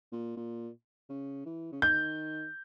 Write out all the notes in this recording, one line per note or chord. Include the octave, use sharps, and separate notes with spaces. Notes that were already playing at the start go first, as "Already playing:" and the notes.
A#2
A#2
C#3
E3
C#3
D#3 G6